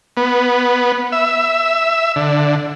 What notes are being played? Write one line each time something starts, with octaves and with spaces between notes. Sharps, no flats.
B3
E5
D3